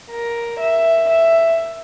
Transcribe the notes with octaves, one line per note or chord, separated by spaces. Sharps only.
A#4
E5
E5